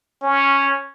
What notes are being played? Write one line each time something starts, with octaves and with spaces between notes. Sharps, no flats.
C#4